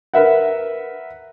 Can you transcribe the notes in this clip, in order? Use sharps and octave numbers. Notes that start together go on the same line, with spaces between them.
A#4 B4 E5 F#5